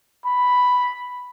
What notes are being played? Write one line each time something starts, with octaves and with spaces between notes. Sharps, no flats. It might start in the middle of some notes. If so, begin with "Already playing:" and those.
B5